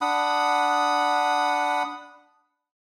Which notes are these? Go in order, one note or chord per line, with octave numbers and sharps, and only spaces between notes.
D4 F#5 B5 D#6